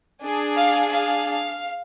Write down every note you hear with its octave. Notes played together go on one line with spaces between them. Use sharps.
D4 G#4
F5
F5